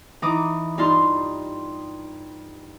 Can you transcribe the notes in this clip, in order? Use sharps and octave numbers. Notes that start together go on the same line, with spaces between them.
E3 D#4 A#5 D6 D#6
G2 D#4 F4 A5 C6